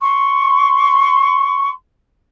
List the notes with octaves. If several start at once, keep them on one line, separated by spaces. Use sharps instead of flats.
C6 C#6